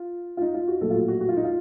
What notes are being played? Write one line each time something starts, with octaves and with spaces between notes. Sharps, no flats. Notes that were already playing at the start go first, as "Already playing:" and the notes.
Already playing: F4
F4
D#4
F4
F#4
A#1 A2 F#3 A4
F4
F#4
F#4
F#4
F4
D#4
F4